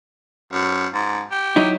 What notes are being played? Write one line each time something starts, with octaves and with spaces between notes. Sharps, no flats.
F#2
G#2
G4
F#3 D#4 E4